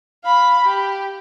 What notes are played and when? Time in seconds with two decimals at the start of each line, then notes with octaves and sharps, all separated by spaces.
0.24 F5 B5
0.65 G4